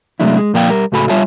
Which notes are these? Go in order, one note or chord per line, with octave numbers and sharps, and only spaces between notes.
C3 F#3 G#3 A3 D4 E4
G#3
A#2 F3 A#3 D5 F5 G5
G3 A#4
C#2 A2 F#4 A4 G#5 B5
G3 F4 C#5 E5 G#5 A5